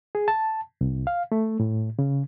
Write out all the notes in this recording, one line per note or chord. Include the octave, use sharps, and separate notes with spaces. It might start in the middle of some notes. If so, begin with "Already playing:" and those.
G#4
A5
C2
F5
A3
A2
C#3